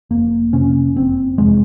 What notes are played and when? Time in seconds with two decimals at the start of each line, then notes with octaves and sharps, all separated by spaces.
0.10 F1 A#3
0.53 F2 C3 C#4
0.96 F#1 C4
1.38 F2 C3 G#3